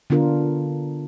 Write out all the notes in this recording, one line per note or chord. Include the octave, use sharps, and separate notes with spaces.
D3 B3 D4 F4 A#4